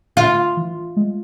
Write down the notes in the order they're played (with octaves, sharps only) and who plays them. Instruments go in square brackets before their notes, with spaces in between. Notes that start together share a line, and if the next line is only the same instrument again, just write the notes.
[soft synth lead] D3 [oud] F4
[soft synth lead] E3
G#3